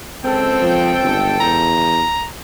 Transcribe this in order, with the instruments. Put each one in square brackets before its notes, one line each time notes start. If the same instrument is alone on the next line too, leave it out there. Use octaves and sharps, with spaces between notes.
[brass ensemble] C#2 A4 G5 [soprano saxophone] C4
[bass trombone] F3
G1
[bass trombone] E2 [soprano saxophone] A#5